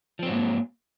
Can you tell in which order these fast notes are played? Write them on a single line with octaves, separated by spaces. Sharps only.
F3 C4 F#3 G#2 A#3